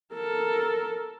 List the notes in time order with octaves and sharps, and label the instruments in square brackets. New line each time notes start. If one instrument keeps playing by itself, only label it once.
[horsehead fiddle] A4 A#4